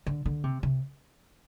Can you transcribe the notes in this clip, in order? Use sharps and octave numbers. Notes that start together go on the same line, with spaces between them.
D3
D3
C3
C3